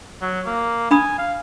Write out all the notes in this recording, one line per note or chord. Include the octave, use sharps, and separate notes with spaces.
F#3
A#3
D4 G#5 B5 D#6
F5